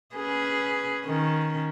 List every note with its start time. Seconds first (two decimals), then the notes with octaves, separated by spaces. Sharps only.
0.15 C#4 G#4 B4
1.05 D#3 C#4